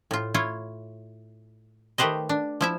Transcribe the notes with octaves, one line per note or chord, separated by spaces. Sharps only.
A2 F4
E4 F4 C#5
D#3 A3 G4 B4 C5 D#5
D4
F3 E4 E5